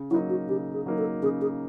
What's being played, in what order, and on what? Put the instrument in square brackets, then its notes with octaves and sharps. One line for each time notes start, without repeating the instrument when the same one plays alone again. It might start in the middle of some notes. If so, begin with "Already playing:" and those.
Already playing: [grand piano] C#3
[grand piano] F#3 A#3 D#4 [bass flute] E4
[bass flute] F#4
[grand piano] C#3 [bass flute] G4
[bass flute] G#4
[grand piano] F#3 A#3 D#4
[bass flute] A4
[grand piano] C#3 [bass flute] G#4
[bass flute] G#4